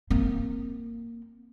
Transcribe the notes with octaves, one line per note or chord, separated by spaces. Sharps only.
A#3 C4